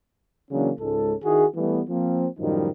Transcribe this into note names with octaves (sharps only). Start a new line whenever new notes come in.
C#3 E3 F#3 A#3 C#4 D4
C#2 G#2 G#3 C#4 A4
D#3 E4 F#4 G#4
E3 G3 A3 B3
F3 A#3 C4
F#2 A2 D#3 F3 G3 D#4